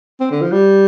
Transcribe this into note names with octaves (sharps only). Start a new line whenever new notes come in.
C4
D3
F3
G3